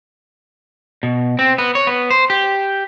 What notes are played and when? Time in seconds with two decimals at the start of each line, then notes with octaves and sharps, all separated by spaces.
1.03 B2
1.39 C4
1.58 B3
1.75 C#5
1.87 B3
2.11 C5
2.30 G4